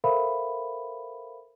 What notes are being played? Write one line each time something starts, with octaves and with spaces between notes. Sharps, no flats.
A4 A#4 C5 E5 F5 B5